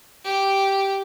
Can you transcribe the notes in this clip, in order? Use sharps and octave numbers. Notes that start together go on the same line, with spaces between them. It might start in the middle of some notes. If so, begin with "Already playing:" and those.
G4